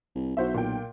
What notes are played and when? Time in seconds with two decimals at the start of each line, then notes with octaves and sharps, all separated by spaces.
0.15 C2
0.37 B1 F#4 C5 E5
0.54 A#2 G5